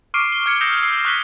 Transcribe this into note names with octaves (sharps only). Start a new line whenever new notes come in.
C#6 D6 F6 C7 D7 D#7
G7
F6 G#6 C#7
D#6 E6 G6 A#6 C7 E7
E6 C7
C#6 D#6 F#6 A#6 B6 G7